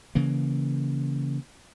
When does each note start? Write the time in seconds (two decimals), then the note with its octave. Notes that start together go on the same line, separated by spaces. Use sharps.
0.15 C#3 E3 A#3